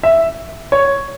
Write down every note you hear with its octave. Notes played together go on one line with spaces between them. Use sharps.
E5
C#5